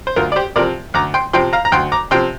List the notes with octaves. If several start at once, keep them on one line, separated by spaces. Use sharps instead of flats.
C5
D2 F4 A#4
D5
G4 C5
C3 F3 A#4 D5
D2 A#5 D6
G5 C6
C3 F3 G5 C6
F5 A#5
A#5
D2 G5 C6
A#5 D6
C3 F3 G5 C6